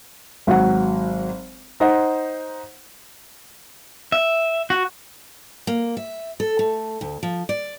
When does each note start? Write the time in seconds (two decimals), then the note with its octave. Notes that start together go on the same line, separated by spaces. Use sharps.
0.47 G#1 F#3 F#5
1.80 D#4 C5 D#5 F#5
4.12 E5
4.70 F#4
5.67 A#3
5.97 E5
6.40 A4
6.59 A3
7.01 D2
7.23 F3
7.49 D5